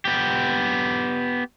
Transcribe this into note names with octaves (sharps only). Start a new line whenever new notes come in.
B3 G4